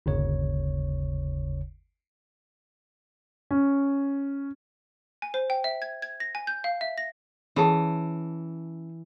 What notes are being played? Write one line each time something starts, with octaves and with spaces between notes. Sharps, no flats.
G1 D#2 C#3 C#5
C#4
G#5
C5
G5
E5
G#6
G#6
A#6
G#5
G6
F5
E5
A#6
E3 C#4 G#4 A5